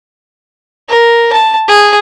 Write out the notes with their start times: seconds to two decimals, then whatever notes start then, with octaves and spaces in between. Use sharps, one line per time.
0.89 A#4
1.32 A5
1.68 G#4